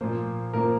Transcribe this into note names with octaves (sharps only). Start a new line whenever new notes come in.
A#2 F3 A#3 C5
A#2 F3 A#3 A#4